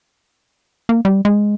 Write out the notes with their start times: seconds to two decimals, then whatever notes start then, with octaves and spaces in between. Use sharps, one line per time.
0.89 A#3
1.05 G3
1.25 G#3